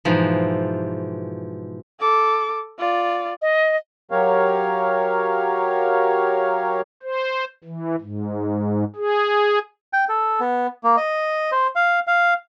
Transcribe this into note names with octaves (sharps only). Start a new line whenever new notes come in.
G#2 B2 E3 F3
A4 D6
F4 D5
D#5
F#3 G4 A#4 C#5 F5
C5
E3
G#2
G#4
G5
A4
B3
A#3
D#5
C5
F5
F5